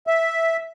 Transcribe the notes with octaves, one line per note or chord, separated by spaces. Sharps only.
E5